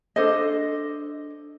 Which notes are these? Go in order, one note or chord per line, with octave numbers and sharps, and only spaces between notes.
D4 A4 C5 D#5